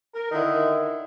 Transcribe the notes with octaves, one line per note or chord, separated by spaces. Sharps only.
A#4
D3 D#3 E4